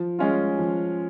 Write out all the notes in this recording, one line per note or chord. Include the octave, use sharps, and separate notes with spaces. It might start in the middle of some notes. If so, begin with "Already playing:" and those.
Already playing: F3
G#3 C#4 F4
F3